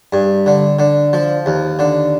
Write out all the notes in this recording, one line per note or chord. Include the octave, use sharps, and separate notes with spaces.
G2
D3
D3
F3
D#2
D3